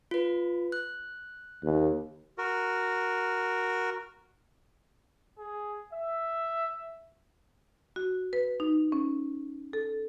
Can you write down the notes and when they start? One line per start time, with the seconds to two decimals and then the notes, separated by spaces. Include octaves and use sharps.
0.11 F4 B4
0.72 F#6
1.63 D#2
2.38 F#4 A#4
5.37 G#4
5.92 E5
7.96 F#4
8.33 B4
8.60 D#4
8.92 C#4
9.73 A4